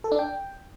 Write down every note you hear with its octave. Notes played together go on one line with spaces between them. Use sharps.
A4
D4
G5